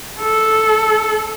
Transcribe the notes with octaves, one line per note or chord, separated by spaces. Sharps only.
A4